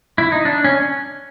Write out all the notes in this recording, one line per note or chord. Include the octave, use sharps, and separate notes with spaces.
E4
D#4
D4
C#4